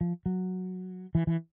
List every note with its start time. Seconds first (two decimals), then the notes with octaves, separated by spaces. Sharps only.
0.01 F3
0.26 F#3
1.15 E3
1.27 E3